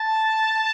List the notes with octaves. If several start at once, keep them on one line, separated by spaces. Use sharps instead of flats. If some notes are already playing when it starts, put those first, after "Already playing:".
Already playing: A5